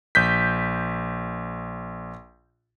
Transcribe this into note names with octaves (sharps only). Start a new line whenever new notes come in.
A#1 G6 B6